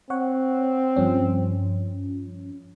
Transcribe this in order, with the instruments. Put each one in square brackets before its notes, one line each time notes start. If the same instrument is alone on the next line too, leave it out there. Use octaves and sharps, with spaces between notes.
[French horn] C4 [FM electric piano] C#5 F#5
[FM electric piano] G2 F3 C#4